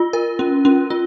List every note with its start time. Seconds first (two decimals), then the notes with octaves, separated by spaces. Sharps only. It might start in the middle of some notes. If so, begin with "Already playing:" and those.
Already playing: F4
0.13 A#4
0.39 C#4
0.65 C#4
0.90 F4